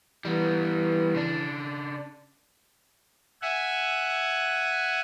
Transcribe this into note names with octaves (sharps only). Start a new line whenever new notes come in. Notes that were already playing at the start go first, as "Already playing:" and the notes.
E3 G3 B3
C#3 D4
E5 F#5 G#5